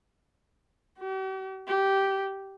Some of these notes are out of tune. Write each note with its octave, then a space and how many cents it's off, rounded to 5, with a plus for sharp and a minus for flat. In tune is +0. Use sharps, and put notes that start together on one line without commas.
G4 -45
G4 -10